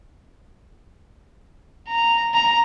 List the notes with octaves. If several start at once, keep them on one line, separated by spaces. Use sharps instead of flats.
A#5
A#5